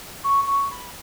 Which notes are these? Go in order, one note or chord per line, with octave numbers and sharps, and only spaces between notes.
C#6
C#6
B5